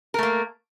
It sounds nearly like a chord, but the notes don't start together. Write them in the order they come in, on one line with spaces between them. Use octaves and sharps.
A#4 A3 A#3